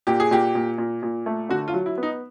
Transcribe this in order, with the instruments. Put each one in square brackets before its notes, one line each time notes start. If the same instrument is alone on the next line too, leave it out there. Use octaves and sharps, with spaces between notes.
[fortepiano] A#2 [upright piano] G4
[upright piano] G#4
[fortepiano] A#2 [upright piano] G4
[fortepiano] A#2
A#2
A#2
A3
[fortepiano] D3 [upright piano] F#4
[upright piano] F4
[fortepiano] F#3
[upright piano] E4
[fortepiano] B3
[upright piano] D#4